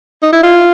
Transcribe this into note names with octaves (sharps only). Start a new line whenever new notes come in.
D#4
E4
F4